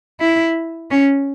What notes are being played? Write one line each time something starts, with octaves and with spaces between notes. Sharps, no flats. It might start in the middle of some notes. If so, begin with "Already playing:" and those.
E4
C#4